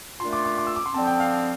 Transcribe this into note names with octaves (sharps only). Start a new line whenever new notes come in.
A#2 A3 D4 F4 C6
D6
D6
D6
E6
D6
C6
D3 F3 C4 A5
G5
F5